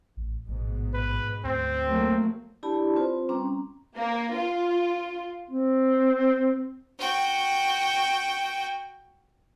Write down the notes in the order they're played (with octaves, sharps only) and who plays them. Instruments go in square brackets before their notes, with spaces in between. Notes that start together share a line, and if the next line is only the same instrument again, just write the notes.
[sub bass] A1
[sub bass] A1 [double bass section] G#2 B2
[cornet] B4
[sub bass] D2 [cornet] C4
[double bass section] F#3 A3 A#3
[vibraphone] D4 E4 G4 D5 A5 B5
C4 F4 B4 C5
G3 C4 C#4 A#5 D6
[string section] A#3
F4
[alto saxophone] C4
[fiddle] F#4 G5